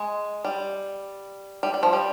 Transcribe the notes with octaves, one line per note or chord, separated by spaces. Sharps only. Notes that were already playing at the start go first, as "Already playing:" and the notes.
Already playing: G#3
G3
G3
G3
F3
G3